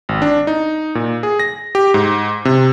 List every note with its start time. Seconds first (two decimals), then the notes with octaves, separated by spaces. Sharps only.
0.09 G#1
0.22 D4
0.47 D#4
0.95 A#2
1.23 G#4
1.39 A#6
1.75 G4
1.94 G#2
2.45 C3